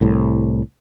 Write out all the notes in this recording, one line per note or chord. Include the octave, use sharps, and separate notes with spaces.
C2 A2